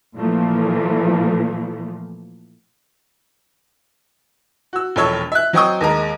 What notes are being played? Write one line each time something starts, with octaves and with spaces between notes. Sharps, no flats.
A#2 E3 F3 A3 A#3
F#4 E6
E1 A#1 A4 C#5 E6
E5 F#6
F#3 C4 D#5 G5 C#6 D#6
D#2 G#3 A#4